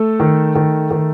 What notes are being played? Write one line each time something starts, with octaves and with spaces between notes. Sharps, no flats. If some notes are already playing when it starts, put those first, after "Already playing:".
Already playing: A3 A4
D#3
D#3
D#3